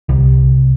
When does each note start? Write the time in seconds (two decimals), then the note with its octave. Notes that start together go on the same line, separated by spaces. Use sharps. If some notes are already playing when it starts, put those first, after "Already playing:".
0.09 C2